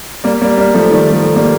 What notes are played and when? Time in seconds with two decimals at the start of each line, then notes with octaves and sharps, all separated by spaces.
0.24 G3 A#3
0.41 G3 A#3
0.57 G3 A#3
0.74 F3 A3
0.91 D#3 G3
1.13 F3 A3
1.35 G3 A#3